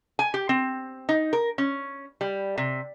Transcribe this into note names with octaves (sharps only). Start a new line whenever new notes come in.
G#5
G4
C4
D#4
A#4
C#4
G3
C3